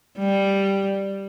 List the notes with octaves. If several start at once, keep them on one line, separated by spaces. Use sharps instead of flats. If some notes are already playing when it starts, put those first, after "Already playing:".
G3